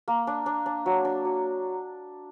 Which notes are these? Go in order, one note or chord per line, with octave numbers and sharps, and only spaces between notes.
A#3
D4
D4
D4
F#3
D4
F#3